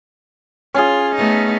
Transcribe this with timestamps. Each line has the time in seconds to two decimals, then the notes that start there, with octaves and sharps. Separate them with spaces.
0.74 C#4 F4 G#4
1.16 A3 B3 D#4